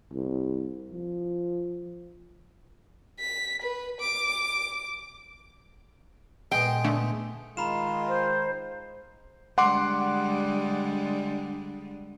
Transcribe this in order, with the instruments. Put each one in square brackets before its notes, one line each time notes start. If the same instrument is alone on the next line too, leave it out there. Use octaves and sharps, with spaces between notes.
[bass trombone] C2
F3
[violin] B6
B4
D6
[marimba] A#2 [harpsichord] G#3 B3 [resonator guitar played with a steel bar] G5
[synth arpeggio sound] D3 A3
[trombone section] D#3 G#3 [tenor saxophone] F4 [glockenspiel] A#5 B5 E7
[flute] C5
[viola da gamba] D3 G3 G#3 [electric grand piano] F#5 C6 D6